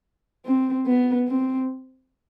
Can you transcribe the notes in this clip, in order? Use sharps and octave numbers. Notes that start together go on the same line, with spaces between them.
C4
B3
C4